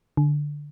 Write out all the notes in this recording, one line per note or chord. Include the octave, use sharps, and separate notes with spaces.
D3